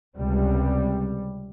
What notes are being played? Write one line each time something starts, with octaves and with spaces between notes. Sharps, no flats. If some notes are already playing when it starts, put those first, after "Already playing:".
C#2 C3 G3